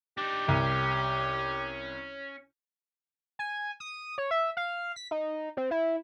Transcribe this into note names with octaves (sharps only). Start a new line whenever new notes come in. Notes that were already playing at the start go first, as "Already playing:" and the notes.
D4 D#4 G4
C2 C#4
G#5
D#6
C#5
E5
F5
B6
D#4
C4
E4